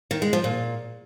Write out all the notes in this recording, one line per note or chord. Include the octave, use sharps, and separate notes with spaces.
D#3
G#3
F3
A#2